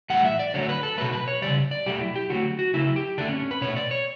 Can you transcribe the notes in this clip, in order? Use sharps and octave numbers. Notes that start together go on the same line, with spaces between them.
A2 E3 G3 F#5
E5
D5
D3 F#3 A3 C#5
B4
A4
B2 F#3 A3 B4
B4
C#5
C#3 E3 G3 D5
D5
B2 F#3 A3 G4
E4
G4
D3 F#3 A3 F#4
F#4
C#3 F#3 A3 E4
G4
D3 A3 D4
C#4
C#4
B4
B2 A3 C#5
D5
C#5